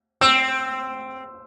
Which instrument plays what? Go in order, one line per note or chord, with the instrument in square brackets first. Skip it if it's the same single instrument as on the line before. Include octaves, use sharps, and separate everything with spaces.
[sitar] C4 [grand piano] E6